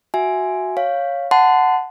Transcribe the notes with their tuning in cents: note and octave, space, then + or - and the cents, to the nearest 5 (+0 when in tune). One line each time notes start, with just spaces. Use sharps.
F#4 +0 E5 +5 G#5 +0
C#5 +0 F5 +0
F#5 +0 A5 +0 C6 -40